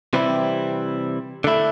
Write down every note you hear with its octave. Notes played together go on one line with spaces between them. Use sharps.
C3 E3 G3 C4 E4
D3 A3 E4